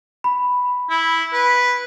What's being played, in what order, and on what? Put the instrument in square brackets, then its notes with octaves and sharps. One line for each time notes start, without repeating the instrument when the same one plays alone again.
[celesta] B5
[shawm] E4
B4